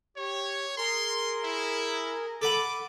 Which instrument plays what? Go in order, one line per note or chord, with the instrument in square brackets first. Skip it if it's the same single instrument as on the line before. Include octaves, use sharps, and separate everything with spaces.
[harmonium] G4 [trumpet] C#5
[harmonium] G#4 A#4 [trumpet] C6
[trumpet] E4
[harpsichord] A4 B4 F#5 [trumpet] D6